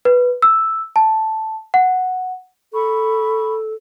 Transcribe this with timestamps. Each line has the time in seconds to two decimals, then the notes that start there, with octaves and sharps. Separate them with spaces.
0.05 B4
0.42 E6
0.96 A5
1.74 F#5
2.73 A4 B5 C#6